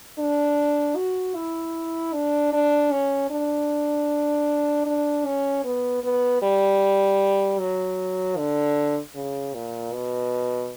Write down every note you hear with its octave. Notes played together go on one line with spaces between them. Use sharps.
D4
F#4
E4
D4
D4
C#4
D4
D4
C#4
B3
B3
G3
F#3
D3
C#3
A#2
B2